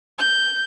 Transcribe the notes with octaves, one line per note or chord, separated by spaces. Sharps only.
G6